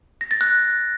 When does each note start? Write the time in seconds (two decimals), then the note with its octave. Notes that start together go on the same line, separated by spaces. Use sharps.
0.21 A#6
0.31 A6
0.41 F#6